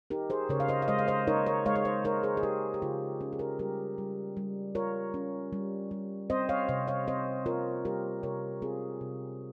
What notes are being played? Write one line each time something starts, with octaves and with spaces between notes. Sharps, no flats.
D#4 G4 A#4
G#4 C5
C#3 A#4 C#5
F5
C5 D#5
F5
G#3 C5 D#5
F5
C5 D#5
D#4 A#4 C#5
A#4 C#5
G#3 C#5 F5
C#5
C5 D#5
D#4 A#4 C#5
G#4 C5
G#4
D#4 G4 A#4
G4
C#3 F4 G#4
C#4
G#4
G4 A#4
G3 G4 A#4
G3
G3
F4 A#4 C#5
C#4
G3
G3
C4 C5 D#5
C#5 F5
C3 C5 D#5
C#5 F5
C4 C5 D#5
F4 A#4 C#5
G3 G4 A#4
C3 A#4 C#5
C4 F4 G#4
C3